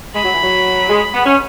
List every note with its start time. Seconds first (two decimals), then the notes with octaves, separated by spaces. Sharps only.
0.15 G#3 B5
0.24 F#3
0.34 E3
0.43 F#3
0.90 G#3
1.14 B3
1.26 C#4